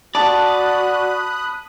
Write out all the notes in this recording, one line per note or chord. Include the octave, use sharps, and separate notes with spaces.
F#4 D5 A5 B5 D#6 F#6